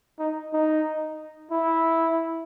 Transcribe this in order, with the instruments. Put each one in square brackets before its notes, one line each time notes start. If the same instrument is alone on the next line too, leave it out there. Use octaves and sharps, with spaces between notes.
[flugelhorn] D#4
D#4
E4